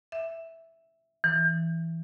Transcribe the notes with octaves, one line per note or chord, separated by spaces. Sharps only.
E5
E3